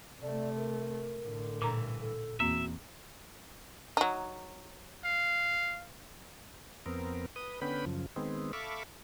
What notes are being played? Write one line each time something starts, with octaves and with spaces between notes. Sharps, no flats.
C3 A3 D5
A#4
A2 D3
G2 A#2 E3 A#5
A4
E2 A#3 C4 F#4 E5
F#3 D#4
F5
F2 B3 C4 A#4
B4 D#6
D3 B3 C#4 B4 G5 B5
F#2 C#3 F3
D#3 G#3 B3 C4
A4 E5 F5 B5 C#6 D6